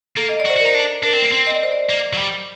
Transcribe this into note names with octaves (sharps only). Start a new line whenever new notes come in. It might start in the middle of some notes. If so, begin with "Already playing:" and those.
A#3 A4
D#5
D5
F#4
C5
F#4 A#4
D#4
D4
D4 A#4
C4
A#3
C4
D#5
D5
C5
D5
A#3
F#3
G3